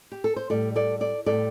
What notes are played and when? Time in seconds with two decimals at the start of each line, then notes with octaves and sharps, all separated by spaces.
0.12 G4
0.24 A4
0.36 C5
0.50 A2 G3 A4 D5
0.76 A4 D5
1.01 A4 D5
1.26 A2 G3 A4 D5